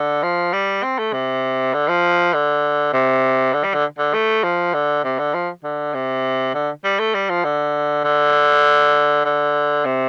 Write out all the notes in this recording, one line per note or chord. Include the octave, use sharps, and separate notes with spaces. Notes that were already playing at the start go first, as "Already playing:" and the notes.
Already playing: D3
F3
G3
C4
A3
C3
D3
F3
D3
C3
D3
G3
D3
D3
A3
F3
D3
C3
D3
F3
D3
C3
D3
G3
A3
G3
F3
D3
D3
D3
C3